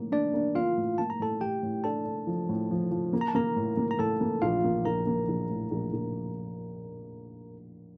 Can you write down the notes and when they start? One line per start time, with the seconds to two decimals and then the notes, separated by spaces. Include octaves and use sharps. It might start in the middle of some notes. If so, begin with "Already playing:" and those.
Already playing: A2 A#3
0.12 A#3 D4 D5
0.34 A#3
0.55 A#3 F4 F5
0.77 A2
0.98 A#3 A5
1.10 A#5
1.19 A2 A4 A5
1.41 A2 G4 G5
1.63 A2
1.84 D4 A4 A5
2.05 D4
2.27 F3
2.49 A2
2.71 F3
2.91 F3
3.13 A#3
3.21 A#5
3.28 A5
3.35 A#3 A#4 A#5
3.56 A2
3.77 A#3
3.91 A#5
3.99 A2 A4 A5
4.21 A#3
4.42 A#1 F4 F5
4.64 A#3
4.85 A#1 A#4 A#5
5.07 A#3
5.28 A#1
5.50 A2
5.71 A#1
5.93 A#1